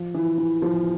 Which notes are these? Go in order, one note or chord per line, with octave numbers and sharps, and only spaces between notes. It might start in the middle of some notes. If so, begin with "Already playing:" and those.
Already playing: F3
E3
E3
F3